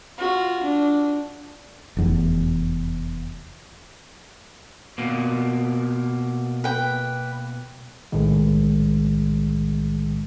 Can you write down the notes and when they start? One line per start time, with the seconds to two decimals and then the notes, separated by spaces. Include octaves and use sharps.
0.18 F4 F#4
0.63 D4
1.97 F1 E2
4.98 B2 A#3
6.64 B4 G5
8.12 B1 A2 D#3 G#3